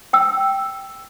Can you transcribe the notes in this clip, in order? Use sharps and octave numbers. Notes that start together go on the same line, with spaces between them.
G5 E6